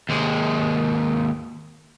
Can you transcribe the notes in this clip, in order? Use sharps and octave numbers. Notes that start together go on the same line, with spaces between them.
D#2 G#3